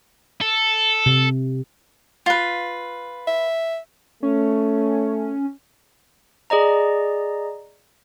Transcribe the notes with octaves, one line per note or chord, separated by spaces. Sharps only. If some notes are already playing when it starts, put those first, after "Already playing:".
A4
C3
F4 B4
E5
A3 C#4
G#4 D5 D#5 A#5